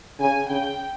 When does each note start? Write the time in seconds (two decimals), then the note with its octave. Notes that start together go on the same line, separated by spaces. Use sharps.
0.19 C#3 G#5
0.49 C#3 G5